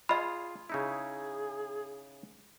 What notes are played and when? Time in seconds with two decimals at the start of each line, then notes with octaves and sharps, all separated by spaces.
0.09 F4 G#4 D#5 B5
0.70 C#3 D#4 E4 G#4